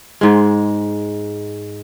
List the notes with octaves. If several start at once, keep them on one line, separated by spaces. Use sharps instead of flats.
G#2 G#3